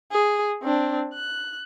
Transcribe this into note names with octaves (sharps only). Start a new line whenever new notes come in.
G#4
C4 D4
F#6